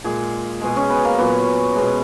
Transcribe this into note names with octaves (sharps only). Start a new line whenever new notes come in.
A#2 G#3 G#4
B2 G#3
C#4
B3
A#3
A#2 F#3 B3
B2 G#3